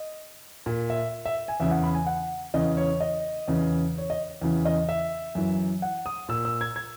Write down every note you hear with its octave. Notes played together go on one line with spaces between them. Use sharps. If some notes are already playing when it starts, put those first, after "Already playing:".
Already playing: D#5
A#2
E5
E5
G#5
E2 C#3 E3 E5
F#5
B5
G#5
F#5
E2 C#3 E3 D#5
C#5
D#5
E2 C#3 E3
C#5
D#5
E2 C#3 E3
D#5
E5
F#2 E3
F#5
D#6
A#2 E6
E6
G#6
G#6